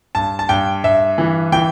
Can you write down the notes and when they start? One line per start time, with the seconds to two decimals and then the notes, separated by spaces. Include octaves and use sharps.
0.15 G2 A5
0.39 A5
0.49 G2 G5
0.83 G2 E5
1.18 E3
1.52 E3 G5